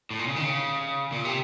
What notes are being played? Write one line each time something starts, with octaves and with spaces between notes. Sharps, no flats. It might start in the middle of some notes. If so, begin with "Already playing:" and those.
A2
A#2
C#3
D#3
C#3
A#2
C3